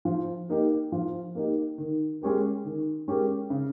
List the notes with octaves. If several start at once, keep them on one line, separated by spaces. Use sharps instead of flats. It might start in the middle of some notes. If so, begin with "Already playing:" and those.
F3
A#3 D#4 G4
F3
A#3 D#4 G4
D#3
G#3 C#4 G4 A#4
D#3
G#3 C#4 G4 A#4
C#3